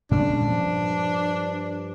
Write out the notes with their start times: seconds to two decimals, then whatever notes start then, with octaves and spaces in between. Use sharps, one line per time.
0.11 A#2 G#3 C#4 D4
0.47 G2 F3